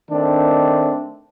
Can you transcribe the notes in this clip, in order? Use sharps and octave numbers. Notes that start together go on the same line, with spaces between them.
D#3 A3 C4 D4